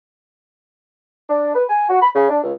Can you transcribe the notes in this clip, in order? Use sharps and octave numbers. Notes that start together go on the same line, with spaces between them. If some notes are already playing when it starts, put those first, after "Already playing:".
D4
B4
G#5
F#4
B5
C#3
D4
C#2